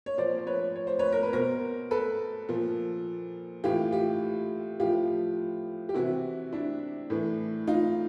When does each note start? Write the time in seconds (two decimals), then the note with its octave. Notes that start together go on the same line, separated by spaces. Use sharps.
0.06 C#5
0.18 A#2 F3 C5 D5
0.38 C5
0.47 B4 C#5
0.76 C#5
0.87 C5
0.99 B4 C#5
1.12 A#4
1.23 B4
1.33 B2 A#4 C5
1.91 A4 B4
2.49 A#2 F3
3.64 A2 E3 F4 G4
3.92 F4 G4
4.80 A2 F3 F4 G4
5.89 G4
5.94 C3 E3 E4 F#4
6.52 D4 E4
7.10 A2 E3
7.67 D#4 F4